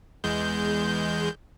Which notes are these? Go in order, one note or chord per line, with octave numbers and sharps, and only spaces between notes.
E2 G#3 G6